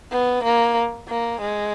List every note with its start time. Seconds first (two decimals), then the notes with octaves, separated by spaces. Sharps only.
0.11 B3
0.44 A#3
1.08 A#3
1.41 G#3